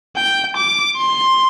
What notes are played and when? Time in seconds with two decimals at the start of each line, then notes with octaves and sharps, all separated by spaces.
0.17 G5
0.57 D6
0.98 C6